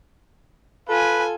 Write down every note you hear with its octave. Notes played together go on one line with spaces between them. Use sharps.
F4 A4 B4 G#5